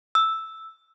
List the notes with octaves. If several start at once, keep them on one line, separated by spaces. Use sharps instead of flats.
E6